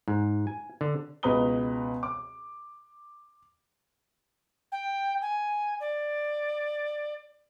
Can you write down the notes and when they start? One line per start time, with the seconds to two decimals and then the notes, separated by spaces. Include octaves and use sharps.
0.08 G#2
0.47 G#5
0.81 D3
1.23 C#2 B2 B4 A#5 D#6 G7
2.03 D6
4.72 G5
5.21 G#5
5.80 D5